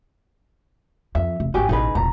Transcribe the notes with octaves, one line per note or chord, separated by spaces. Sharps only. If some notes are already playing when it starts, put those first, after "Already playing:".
F2 E5
F1
G#1 F2 F#4 G4 G#5
A1 B2 D#4 G#4 B4
E1 A#1 A#5